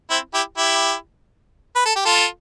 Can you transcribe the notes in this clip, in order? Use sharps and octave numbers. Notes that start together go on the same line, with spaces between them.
C4 E4
E4 G4
E4 G4
B4
A4
G4
F4 A4